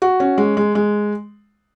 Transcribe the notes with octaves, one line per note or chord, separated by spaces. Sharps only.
F#4
C#4
G#3
G#3
G#3